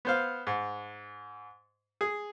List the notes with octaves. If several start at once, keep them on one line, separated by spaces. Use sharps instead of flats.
B3 C5 F5
G#2
G#4